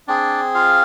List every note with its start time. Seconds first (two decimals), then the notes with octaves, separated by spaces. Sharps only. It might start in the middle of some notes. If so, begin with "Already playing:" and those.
0.08 C4 D4 G#4 D5
0.55 F4 F5